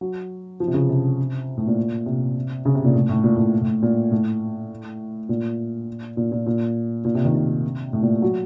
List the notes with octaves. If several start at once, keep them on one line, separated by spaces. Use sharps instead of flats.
F#3
F3
C3
C#3
C3
A2
A#2
C3
C#3
C3
A#2
A2
A2
A#2
A2
A2
A#2
A2
A#2
A#2
A#2
A#2
A#2
C3
D#3
C3
A2
A#2
F#3